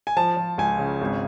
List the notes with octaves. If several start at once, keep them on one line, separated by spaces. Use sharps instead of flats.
G#5
F3 A5
F3
C#2 G#5
C#3
G#1